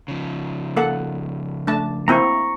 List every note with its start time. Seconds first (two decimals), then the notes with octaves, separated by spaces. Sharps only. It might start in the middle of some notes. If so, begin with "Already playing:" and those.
0.08 C#3 F3
0.77 A#3 A4 F#5
1.67 A3 D4 A5
2.08 A#3 C4 E4 A#5 C#6